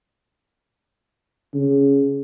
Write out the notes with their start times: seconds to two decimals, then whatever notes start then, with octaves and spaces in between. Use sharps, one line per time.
1.54 C#3